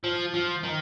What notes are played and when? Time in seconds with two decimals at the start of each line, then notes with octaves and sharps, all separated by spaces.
0.04 F3
0.34 F3
0.63 D#3